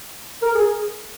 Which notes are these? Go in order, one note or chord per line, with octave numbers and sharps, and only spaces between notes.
A#4
G#4